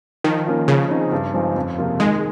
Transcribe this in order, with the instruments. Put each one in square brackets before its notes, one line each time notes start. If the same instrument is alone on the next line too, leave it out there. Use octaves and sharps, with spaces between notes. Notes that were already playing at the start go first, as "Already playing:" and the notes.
[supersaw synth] D#3 [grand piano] F3
[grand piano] A#3 C#4 F4
[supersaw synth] C#3 [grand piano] F3
[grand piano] C4 D#4 G#4
G2
F3 G#3 C4 D#4
F2
C3 F3 A#3 F4
[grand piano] D#3 [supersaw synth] G#3